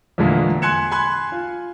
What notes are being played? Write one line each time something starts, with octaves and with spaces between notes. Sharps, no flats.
E2 A#2 D3 G#3 A#3
G#5 C6 F#6 G#6 C#7 E7
G#5 B5 C6 F#6 G#6
F4